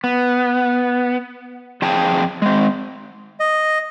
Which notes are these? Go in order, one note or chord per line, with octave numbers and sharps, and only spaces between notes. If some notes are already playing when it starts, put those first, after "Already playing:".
B3
F2 G#4 G5 A5
G#3 C4
D#5